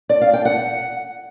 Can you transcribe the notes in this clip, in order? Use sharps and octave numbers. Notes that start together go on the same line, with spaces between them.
D5
F5
G5
F#5